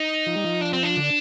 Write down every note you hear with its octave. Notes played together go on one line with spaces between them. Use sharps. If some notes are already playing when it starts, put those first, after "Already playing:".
Already playing: D#4
F3
G3
F3
D4
C4
D4
D3